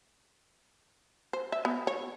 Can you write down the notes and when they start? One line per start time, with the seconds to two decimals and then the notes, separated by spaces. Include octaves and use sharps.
1.33 C5
1.52 E5
1.65 B3
1.87 C#5